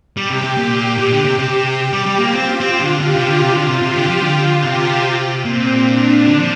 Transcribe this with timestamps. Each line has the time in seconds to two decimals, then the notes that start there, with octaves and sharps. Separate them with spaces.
0.16 G3 G4
0.30 C3
0.44 C3
0.57 A#2 G4
0.98 A#2
1.11 D3
1.25 C3
1.39 C3
1.79 G4
1.93 G3
2.06 G3
2.19 A#3 F4
2.33 C4
2.60 C4 F4
2.80 D3
3.01 D3 G4
3.14 C3
3.28 D3
3.41 C3 F4
3.55 D3
3.68 C3
3.82 C3 G4
3.96 D3
4.09 F3
4.22 D3 F4
4.63 C3 G4
5.45 A#2 C4
5.84 D4
6.26 D3
6.39 F3